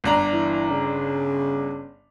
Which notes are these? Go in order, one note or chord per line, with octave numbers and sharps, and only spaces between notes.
G1 D4 A#5
E3
C#3